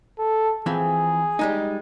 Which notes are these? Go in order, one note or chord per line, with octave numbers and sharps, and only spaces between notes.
A4
E3 F3 C4 G#4
G3 G#3 D#4